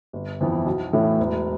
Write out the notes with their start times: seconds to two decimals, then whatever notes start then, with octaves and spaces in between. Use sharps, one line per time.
0.13 G1
0.40 F2 E3 B3
0.66 B1
0.93 A2 E3 A3 E4
1.19 E1